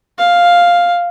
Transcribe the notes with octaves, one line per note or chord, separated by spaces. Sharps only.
F5